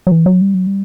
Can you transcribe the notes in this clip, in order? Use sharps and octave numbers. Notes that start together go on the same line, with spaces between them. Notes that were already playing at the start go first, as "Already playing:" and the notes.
F#3
E3
F#3
G3
F#3
G3